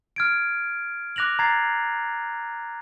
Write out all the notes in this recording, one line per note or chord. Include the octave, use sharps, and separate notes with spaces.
F6 G#6 D7
D6 F#6 A#6 F7 F#7
A#5 G#6 A6 C7